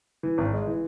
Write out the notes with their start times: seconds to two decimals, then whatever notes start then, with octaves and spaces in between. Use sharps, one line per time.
0.23 E3
0.38 G#1
0.53 G#3
0.67 E3